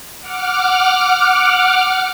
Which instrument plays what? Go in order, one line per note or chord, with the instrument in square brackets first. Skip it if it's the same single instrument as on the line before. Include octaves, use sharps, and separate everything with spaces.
[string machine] F#5 D6 F6